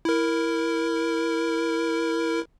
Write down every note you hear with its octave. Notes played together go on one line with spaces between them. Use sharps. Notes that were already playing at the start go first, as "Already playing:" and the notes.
E4 A#4